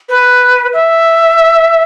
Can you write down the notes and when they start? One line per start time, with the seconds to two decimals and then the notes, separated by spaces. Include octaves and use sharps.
0.09 B4
0.73 E5